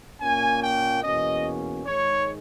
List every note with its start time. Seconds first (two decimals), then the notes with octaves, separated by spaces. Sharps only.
0.21 A#2 A#3 C#4 G#5
0.62 G5
1.03 E2 B2 A#3 C#4 D#5
1.86 G#2 D#3 G#3 C#5